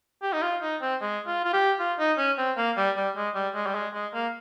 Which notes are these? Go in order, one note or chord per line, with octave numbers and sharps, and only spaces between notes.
G4
D#4
F4
D#4
C4
G#3
F4
F4
G4
F4
D#4
C#4
C4
A#3
G3
G3
G#3
G3
G#3
G3
G#3
G#3
A#3